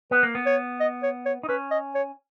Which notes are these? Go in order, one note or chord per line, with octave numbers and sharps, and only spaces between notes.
B3 B4
A#3
B3
C#5
D#5
C#5
C#5
D#4
C#4 B4
D#5
C#5